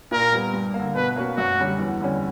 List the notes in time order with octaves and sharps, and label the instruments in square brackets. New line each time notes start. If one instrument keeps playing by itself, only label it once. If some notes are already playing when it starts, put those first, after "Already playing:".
[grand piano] A#2 [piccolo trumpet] A#4
[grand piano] G3 B3
G2
A#3
D3
[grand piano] B2 [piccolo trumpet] B4
[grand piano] A#3 C#4 F#4
[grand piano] F#2 [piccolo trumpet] F#4
[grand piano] D3 G3 C#4 G4
E2
D3 G3 C#4